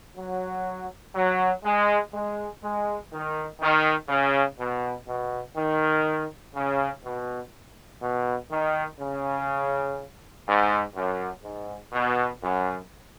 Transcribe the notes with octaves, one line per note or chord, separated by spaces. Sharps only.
F#3
F#3
G#3
G#3
G#3
D#3
D#3
C#3
B2
B2
D#3
C#3
B2
B2
D#3
C#3
G#2
F#2
G#2
B2
F#2